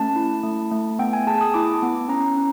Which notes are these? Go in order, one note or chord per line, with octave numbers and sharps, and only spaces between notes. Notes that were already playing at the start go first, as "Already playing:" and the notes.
Already playing: A3 C#4 A5
E4
A3
A3
B3 G5
G#5
G#4 A5
D#6
E4 D6
B3
C#4 A#5
C#4